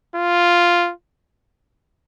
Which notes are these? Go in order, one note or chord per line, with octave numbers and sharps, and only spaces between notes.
F4